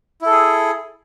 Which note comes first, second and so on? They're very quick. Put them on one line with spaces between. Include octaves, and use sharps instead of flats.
E4 A4 G#4